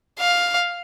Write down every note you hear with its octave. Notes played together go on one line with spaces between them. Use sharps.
F5